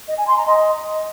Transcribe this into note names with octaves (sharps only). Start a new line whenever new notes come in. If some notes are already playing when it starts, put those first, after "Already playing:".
D#5
G#5
C6
A#5
D#5